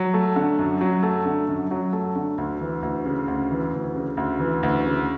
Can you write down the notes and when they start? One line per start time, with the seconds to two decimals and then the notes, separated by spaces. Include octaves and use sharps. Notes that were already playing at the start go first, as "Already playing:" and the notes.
Already playing: F#3
0.14 A3
0.36 D3
0.59 F#2
0.81 F#3
1.03 A3
1.26 D3
1.49 F#2
1.71 F#3
1.93 A3
2.16 D3
2.38 D2
2.61 E3
2.83 D2
3.05 C#3
3.28 D2
3.51 E3
3.73 D2
3.95 C#3
4.17 D2
4.40 E3
4.63 D2
4.85 C#3